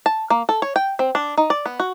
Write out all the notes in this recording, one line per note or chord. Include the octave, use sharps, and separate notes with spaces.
A5
A#3
A4
C#5
G5
C4
D4
D#4
D5
B3
F#4